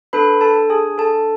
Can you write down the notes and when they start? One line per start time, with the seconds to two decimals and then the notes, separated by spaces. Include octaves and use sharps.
0.13 D4 A4 B4 B5
0.41 A4 A5
0.70 G#4 G#5
0.98 A4 A5